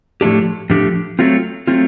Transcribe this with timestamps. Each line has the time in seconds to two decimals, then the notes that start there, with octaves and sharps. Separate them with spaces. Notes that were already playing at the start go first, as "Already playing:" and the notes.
0.21 A2 F3 A3 D4 G4
0.70 A2 F3 A3 D4 G4
1.19 F#3 A3 C4 F4
1.67 F#3 A3 C4 F4